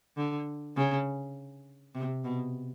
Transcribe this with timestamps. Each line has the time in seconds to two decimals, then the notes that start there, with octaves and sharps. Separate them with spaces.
0.17 D3
0.76 C#3
1.95 C3
2.24 B2